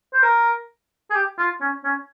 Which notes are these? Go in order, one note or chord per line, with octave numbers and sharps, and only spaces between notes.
C5
A#4
G#4
G4
F4
C#4
C#4